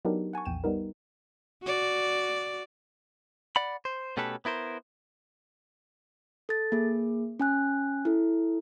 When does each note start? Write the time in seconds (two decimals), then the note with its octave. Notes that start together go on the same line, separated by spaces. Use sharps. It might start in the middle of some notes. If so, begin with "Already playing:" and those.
0.05 F#3 B3 D4 D#4 G4 A#4
0.33 F#5 G#5 A5 C#6
0.45 A#1 E2 G5 D#7 E7
0.64 G3 B3 D#4 A#4
1.64 F#4 D5
3.56 D5 F#5 B5
3.85 C5
4.17 B2 A3 C#4 G4 A4 B4
4.45 B3 E4 A#4 C5
6.49 A4 A6
6.72 A#3 G#4
7.40 C#4 G#5 F#6
8.05 E4 A4